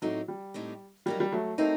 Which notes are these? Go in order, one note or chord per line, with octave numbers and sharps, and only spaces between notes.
A2 F#3 A3 C4 D#4 G4
G3
A2 A3 C4 D#4 G4
F#3 G3 A#3 D#4
G3
F#3 A3
F#3 A3 A#3 C4 D#4